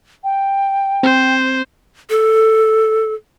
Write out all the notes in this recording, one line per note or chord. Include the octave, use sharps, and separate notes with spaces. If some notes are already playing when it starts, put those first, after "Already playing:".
G5
C4 C5
A4